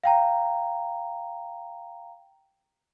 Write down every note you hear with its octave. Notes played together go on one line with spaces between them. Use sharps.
F5 G5 A#5